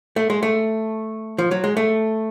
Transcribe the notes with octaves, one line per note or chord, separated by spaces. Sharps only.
A3
G#3
A3
F3
F#3
G#3
A3